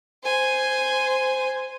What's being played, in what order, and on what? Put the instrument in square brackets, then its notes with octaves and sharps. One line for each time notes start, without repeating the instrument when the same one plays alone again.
[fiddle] C5 G#5